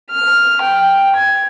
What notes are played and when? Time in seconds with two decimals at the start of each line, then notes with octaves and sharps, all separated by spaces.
0.11 F6
0.63 G5
1.16 G#6